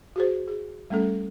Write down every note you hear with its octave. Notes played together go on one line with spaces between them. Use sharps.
F#4 G#4 C5
G#4
G3 A3 C#4 A4